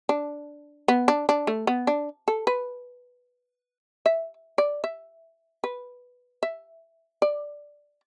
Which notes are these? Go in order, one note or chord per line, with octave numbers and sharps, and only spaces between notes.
D4
B3
D4
D4
A3
B3
D4
A4
B4
E5
D5
E5
B4
E5
D5